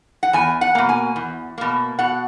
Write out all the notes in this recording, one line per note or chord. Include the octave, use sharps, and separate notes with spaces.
F#5
E2 G#5
F#5
B2 A#3
G#5
E2
B2 A#3
B2 F#5